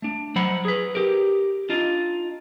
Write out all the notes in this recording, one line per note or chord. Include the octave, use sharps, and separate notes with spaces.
A3 D4
F#3 C5 F#5 B5
G#4 B4
G4 A#4
D4 D#4 F4